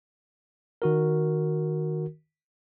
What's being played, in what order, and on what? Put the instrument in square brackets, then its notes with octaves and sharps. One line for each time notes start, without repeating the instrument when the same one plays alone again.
[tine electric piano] D#3 F#4 A#4